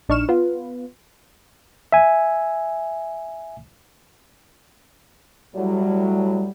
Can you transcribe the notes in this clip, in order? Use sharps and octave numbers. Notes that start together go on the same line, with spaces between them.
A#1 D4 D#4 C#6 F6 E7
B3 F4 B4
E5 G#5
A2 F#3 G3